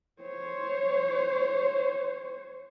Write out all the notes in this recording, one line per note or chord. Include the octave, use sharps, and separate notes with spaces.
C5 C#5